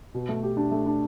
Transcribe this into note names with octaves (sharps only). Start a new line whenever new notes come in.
B2
A3
G4
D4
A3
D4